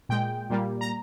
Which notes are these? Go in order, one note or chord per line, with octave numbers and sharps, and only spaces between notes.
A#2 G#3 G5
A#2 G3 A#3
A#5